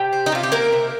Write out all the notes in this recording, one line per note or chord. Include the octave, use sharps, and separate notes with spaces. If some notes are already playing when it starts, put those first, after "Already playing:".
Already playing: C3 G4 G5
C4
D#4
C3 F4
G4
A#3 C4 A#4
C3